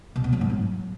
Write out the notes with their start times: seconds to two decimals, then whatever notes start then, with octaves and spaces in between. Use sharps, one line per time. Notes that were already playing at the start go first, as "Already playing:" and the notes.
0.16 B2
0.24 B3
0.33 F#3
0.41 G#2
0.50 F#3